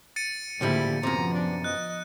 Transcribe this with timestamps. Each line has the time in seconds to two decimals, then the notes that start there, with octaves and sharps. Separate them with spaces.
0.16 A6 C#7 D#7
0.61 C#2 A2 D3 F3 G3 A#3 E4
1.03 F#2 C3 F3 B3 A#5
1.34 D4
1.64 D#5 F#6